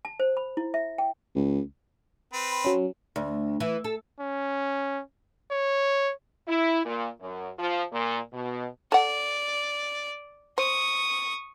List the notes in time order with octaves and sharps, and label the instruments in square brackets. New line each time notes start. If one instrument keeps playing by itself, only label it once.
[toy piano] A5
C5
B5
E4
E5
G5
[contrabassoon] C#2
[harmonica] C4 B4
[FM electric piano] F#3 C#4
[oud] D2
E3
A4
[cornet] C#4
C#5
[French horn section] E4
A#2
F#2
F3
A#2
B2
[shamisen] A4 F#5 [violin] D5
[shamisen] C5 [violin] C#6 D#6